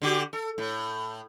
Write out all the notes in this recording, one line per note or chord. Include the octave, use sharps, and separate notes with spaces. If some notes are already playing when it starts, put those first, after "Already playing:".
D3 F#4 G4
A4
A2